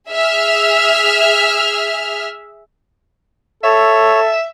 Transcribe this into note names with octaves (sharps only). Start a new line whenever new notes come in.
G#4 E5 F6
A4 C#5 E5